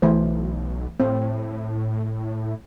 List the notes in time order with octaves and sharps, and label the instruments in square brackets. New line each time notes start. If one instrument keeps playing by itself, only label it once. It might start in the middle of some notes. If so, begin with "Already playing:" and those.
[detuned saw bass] B1 [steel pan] E3 A3 C5
[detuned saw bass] A2 [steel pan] C4